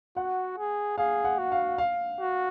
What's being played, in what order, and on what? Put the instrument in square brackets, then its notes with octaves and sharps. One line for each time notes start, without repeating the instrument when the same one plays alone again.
[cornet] F#4 [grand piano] F#5
[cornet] G#4
[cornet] G#4 [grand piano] F5
[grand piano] F#5
[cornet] F#4
[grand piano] F5
F5
[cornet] F#4